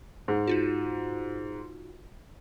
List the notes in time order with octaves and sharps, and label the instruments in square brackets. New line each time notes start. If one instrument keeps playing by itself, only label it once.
[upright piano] G#2
[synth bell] D#4 F4 F#4